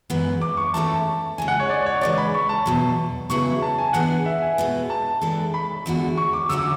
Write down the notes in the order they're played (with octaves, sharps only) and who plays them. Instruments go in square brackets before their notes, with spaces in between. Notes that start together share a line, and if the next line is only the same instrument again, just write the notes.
[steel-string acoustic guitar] F#2 E3 G#3 B3
[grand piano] D6
C#6
[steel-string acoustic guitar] E3 A3 C#4 E4 A4 [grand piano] A5
[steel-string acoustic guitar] C#3 G#3 C#4 [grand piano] G#5
[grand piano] F#5
C#5
D5
C#5
[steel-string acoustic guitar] C#3 E3 G#3 [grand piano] D5
[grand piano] B5
C#6
A5
[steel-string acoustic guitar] E2 B2 F#3
[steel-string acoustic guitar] C#3 F#3 B3 E4 G#4 [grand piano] C#6
[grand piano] A5
G#5
[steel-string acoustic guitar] E3 B3 D4 G#4 [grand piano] F#5
[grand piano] E5
G#5
[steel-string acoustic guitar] B2 G#3 B3
[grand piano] A5
[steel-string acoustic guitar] E3 G#3 D4 A4
[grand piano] B5
[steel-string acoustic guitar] E2 D3 G#3 D4 F#4
[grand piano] C#6
D6
[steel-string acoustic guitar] D3 F#3 A3 C#4 F#4 [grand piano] E6
[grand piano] D6